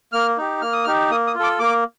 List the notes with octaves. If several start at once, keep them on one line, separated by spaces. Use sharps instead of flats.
A#3 F6
D#4 G4
A#3 F6
D#6
D#4 G4 F6
A#3 D#6
D#6
F4
A4 D6
A#3 D6